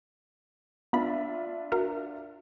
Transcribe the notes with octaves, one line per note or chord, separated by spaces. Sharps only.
B3 D4 F4 E5 B5
F#4 A#4 F5